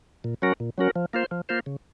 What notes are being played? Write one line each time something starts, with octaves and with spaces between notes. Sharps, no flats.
A#2
F#3 C#4 F#4 A#4
A#2
F#3 C#4 F#4 A#4
F3
A#3 F4 C5
F3
A#3 F4 C5
C#3